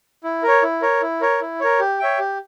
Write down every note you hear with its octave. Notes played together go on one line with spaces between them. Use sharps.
E4
A#4 C#5
E4
A#4 C#5
E4
A#4 C#5
E4
A#4 C#5
G4
C#5 E5 G5
G4